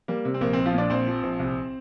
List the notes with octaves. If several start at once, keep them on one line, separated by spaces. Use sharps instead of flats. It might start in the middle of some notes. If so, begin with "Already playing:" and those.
G3 A#3
C3
C4
A#1 A#3
A#1 C4
F3 F4
A#2 D4 D5
A#1 C4 C5
F3
A#1
C2